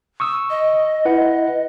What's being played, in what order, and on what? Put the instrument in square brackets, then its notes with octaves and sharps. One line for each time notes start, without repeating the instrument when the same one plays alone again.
[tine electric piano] C#6 D#6 E6
[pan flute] D#5
[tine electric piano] E4 B4 F#5